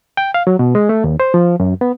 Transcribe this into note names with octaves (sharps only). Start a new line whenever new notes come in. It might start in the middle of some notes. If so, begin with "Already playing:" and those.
G5
F5
F#3
B2
G#3
A3
D#2
C5
F3
F#2
B3